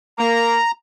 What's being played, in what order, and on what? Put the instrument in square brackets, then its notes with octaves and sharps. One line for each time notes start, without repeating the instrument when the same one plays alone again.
[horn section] A#3 [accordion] A#5